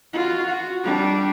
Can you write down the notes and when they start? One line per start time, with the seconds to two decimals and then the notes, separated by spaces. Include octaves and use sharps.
0.13 F4 F#4
0.46 F#4
0.84 G3 D4